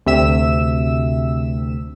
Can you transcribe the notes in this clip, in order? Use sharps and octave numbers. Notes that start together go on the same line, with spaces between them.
D2 C3 E5 E6 E7